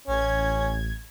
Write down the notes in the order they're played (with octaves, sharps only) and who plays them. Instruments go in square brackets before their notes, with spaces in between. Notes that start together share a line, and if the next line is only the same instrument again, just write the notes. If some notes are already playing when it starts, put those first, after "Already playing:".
[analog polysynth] A1 G#6 [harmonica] C#4